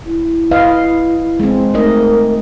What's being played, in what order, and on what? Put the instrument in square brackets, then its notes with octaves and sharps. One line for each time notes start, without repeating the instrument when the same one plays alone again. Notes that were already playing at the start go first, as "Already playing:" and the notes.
[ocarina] E4
[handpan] B4 D#5 F5
G#3 C4
[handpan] A3 D#4 D#5 [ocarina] A#4